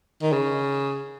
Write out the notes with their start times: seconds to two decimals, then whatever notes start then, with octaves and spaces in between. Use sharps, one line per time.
0.22 D#3
0.32 C#3